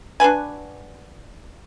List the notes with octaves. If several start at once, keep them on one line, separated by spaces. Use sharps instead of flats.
D4 F#4 B4 G#5